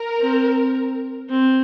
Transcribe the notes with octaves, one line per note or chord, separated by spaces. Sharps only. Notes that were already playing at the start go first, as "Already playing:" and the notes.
Already playing: A#4
C4
C4